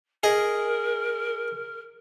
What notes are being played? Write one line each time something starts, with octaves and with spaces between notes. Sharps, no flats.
G#4 A#4 D#5